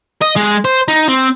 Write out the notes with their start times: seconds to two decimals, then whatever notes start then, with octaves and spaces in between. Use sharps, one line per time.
0.22 D#5
0.36 G#3
0.65 C5
0.88 D#4
1.08 C4